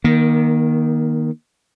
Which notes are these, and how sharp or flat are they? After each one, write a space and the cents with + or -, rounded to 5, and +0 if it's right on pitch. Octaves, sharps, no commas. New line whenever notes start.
D#3 +0 A#3 +30